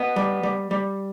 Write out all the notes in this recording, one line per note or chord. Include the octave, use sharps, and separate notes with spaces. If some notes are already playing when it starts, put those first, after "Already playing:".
Already playing: B3 D#5
G3
G3
G3